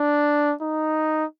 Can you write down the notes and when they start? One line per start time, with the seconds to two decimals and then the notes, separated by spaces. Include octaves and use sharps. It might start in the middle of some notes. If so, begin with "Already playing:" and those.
Already playing: D4
0.62 D#4